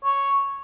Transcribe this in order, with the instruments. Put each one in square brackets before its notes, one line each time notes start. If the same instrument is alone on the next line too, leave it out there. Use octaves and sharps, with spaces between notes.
[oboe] C#5